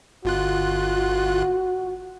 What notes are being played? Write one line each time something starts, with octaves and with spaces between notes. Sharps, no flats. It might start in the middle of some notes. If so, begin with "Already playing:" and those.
G1 F4 F#4 F#6